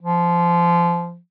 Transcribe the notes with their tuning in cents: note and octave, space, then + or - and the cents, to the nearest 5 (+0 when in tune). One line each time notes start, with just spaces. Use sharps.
F3 -20